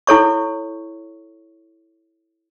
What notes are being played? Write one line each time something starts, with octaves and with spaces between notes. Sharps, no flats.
E4 A4 C#5 C#6